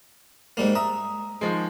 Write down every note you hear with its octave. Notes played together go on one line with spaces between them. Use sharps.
G#2 G3 A#3
E5 A#5 D#6
D#3 F3 G#3